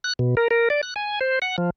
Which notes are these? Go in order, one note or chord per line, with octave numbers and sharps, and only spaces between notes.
F#6
B2
A#4
A#4
D5
F#6
G#5
C5
F#5
F3